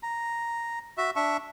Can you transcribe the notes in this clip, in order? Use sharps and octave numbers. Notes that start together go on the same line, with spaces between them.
A#5
F#4 E5
D4 E5 C#6